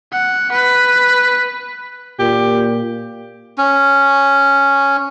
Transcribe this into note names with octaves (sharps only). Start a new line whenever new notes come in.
F#5
B4
A#2 G4
C#4